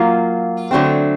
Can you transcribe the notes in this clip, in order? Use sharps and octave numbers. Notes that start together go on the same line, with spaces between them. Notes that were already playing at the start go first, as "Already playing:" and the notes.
Already playing: F#3 A#3 F4
D3 F#3 A3 C4